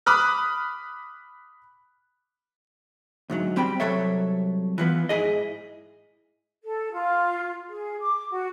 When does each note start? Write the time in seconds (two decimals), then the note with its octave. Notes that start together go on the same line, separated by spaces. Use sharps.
0.06 B5 D6 D#6 F6 F#6
3.30 D2 G#2 F#3
3.56 G3 C4 G5 B5
3.80 C2 C3 F#3 A4 C#5 E5
4.78 E3 F3 B3
5.09 G#2 E4 G#4 D#5
6.63 A4
6.92 F4
7.68 G#4
7.99 D6
8.30 F#4